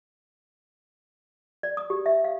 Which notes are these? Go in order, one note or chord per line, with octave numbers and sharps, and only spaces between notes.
D5
D#6
G4
E5
F5